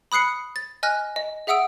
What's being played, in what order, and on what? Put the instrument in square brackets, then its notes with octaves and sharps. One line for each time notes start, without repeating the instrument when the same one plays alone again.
[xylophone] B5 D#6 F#6 C7 C#7
A6
D#5 G#5 F6 F#6 A#6
D#5
G#4 E5 F#5 D#6 E6 D7